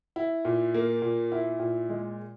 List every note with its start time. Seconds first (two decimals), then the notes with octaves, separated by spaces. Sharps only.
0.16 E4
0.45 A#2
0.74 A#3
1.02 A#2
1.32 E4
1.60 A#2
1.89 G#3